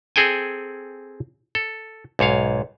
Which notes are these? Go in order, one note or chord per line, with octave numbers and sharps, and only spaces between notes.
C4 G#4 A4 G5 G#5
A4
B1 G#2 C#5 F5